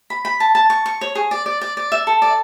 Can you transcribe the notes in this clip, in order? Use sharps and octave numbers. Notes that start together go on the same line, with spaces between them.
B5
B5
A5
A5
C#6
C#6
C#5
G#4
D5
D5
D5
D5
E5
A4
D5